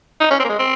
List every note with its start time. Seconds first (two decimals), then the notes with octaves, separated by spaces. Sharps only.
0.21 D#4
0.31 C#4
0.40 C4
0.45 A#3
0.49 G#3
0.59 C4